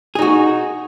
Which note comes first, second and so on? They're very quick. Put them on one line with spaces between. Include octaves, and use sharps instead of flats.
G#4 D#4 F#4